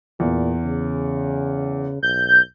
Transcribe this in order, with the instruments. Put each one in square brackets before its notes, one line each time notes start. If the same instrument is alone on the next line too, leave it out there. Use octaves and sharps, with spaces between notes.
[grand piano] E2 [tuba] A#2
[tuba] C#3
[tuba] B1 [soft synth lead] G6